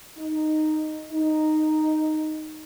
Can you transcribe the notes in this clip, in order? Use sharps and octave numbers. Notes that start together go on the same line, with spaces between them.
D#4
D#4